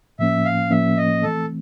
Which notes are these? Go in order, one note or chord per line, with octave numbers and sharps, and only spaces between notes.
A2 F3 A#3 C#4 E5
F5
A2 F3 A#3 C#4 E5
D#5
E3 A3 C4 A4